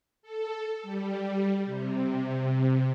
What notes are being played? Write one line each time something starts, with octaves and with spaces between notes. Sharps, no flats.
A4
G3
C3